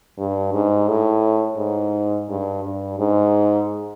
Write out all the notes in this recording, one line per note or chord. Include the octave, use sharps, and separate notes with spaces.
G2
G#2
A2
G#2
G2
G2
G#2